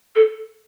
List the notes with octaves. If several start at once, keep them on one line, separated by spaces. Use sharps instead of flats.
A4